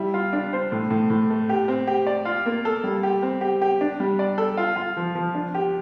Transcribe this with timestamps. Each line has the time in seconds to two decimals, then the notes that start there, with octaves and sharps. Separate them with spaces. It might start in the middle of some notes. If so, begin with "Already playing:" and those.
Already playing: G3 E4
0.14 F4
0.33 D4
0.53 C5
0.72 A2
0.90 A2
1.10 A2
1.30 A3
1.49 G4
1.68 C4
1.87 G4
2.07 D5
2.25 F4
2.46 A#3
2.65 A4
2.84 G3
3.03 G4
3.22 C4
3.41 G4
3.62 G4
3.81 D4
4.00 G3
4.19 D5
4.38 A4
4.57 F4
4.76 F4
4.97 F3
5.15 F3
5.35 D4
5.55 G4